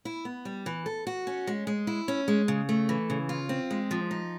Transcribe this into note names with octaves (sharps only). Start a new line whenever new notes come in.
E4
B3
G3
E3
A4
F#4
C#4
G#3
G#3
E4
C#4
G#3
C#3
A3
E3
C#3
F4
C4
G#3
F3
D#4